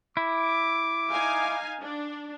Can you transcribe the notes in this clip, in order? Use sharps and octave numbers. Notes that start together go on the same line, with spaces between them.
E4 D6
D#4 F5 G#5
D4